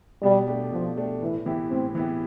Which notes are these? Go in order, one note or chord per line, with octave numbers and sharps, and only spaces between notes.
B2 G3
A3 D4 G4
B2 F3
A3 D4 G4
A2 E3
E3 B3 E4 G4
A2 C4
E3 B3 E4 G4